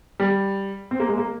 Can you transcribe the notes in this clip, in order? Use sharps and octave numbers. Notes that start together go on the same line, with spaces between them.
G3
C4
A#3
G#3
A#3